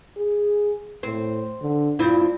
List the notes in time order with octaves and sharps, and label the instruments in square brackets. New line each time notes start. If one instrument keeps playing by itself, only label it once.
[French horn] G#4
[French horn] A2 [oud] C4
[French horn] D3
[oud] G2 C4 E4 [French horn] F4